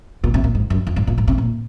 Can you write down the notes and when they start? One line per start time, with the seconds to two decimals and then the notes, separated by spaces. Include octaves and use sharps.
0.24 A#2
0.34 C3
0.44 A#2
0.55 G#2
0.70 F#2
0.87 F2
0.96 G#2
1.07 A#2
1.18 G#2
1.28 C3
1.38 A#2